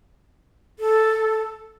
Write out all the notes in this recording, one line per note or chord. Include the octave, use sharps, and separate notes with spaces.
A4